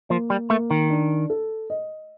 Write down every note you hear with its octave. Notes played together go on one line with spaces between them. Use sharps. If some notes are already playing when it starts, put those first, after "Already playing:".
F3 A#3
G3
A3 A#3
D#3
D4
A4
D#5